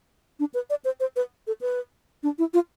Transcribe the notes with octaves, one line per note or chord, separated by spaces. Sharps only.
D4
B4
D5
C5
C5
B4
A4
B4
D4
E4
F4